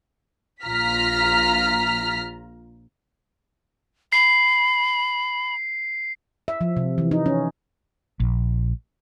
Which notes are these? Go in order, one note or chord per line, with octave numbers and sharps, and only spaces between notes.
A#1 F4 A#5 F6 B6
B5 C7
E5
F3
C3
E3
D#4
C#4
A#1